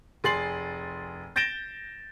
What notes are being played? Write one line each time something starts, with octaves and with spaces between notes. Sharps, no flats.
F1 G#4 C6 A6 C7 F#7
G6 A6 A#6 D7 E7 G7